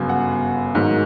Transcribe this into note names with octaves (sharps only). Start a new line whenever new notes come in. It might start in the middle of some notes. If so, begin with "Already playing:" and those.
Already playing: G1 F#2 C#3
F#5
G#2 D#3 F#3